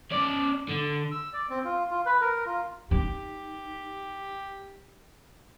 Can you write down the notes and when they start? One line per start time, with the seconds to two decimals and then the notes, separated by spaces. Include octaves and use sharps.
0.11 C#4 D5
0.69 D3
1.12 E6
1.33 D5
1.50 C4
1.65 F4
1.91 F4
2.06 B4
2.21 A#4
2.46 F4
2.91 D#4 G4